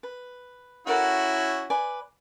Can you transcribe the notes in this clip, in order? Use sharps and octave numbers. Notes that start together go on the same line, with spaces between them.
B4
C#4 E4 F#4 A4 A#4 F#5
B4 D5 G#5